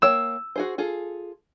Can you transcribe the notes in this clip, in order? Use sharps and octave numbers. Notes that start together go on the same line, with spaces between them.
A#3 C#5 G5 E6
F#4 G#4 C5
F4 G#4 A4